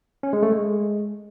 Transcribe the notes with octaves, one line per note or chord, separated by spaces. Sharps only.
C#4
G#3
A3
G#3